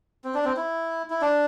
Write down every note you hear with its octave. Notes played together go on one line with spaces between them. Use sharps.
C4
D4
C4
E4
E4
D4